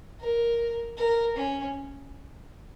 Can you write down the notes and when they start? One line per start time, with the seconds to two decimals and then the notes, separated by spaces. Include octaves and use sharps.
0.20 A#4
0.97 A#4
1.36 C#4